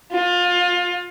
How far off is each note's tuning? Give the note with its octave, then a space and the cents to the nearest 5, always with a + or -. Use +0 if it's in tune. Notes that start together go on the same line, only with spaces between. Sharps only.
F4 +25